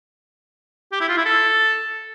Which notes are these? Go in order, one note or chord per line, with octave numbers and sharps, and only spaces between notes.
G4
E4
F4
E4
A4